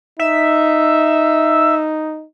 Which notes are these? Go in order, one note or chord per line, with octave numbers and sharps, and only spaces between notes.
D#4 E5